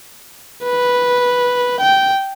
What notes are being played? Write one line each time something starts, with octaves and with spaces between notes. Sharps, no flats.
B4
G5